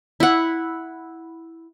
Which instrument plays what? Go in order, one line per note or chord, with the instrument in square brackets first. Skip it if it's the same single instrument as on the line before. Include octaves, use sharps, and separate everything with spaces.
[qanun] E4 F#5